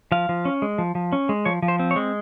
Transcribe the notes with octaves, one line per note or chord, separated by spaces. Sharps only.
F3 F5
F3
C#4
G#3
F3
F3
C#4
G#3
F3 C#5
F3
C5
C4
C#5
G#3